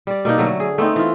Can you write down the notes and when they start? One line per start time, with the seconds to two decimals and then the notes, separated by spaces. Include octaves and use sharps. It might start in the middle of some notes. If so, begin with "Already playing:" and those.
0.07 G3 D5
0.25 B2 A#3 D4 D#4
0.38 D3 F#3 A3
0.60 G#4
0.78 A3 B3 C4 D#4
0.96 E3 F4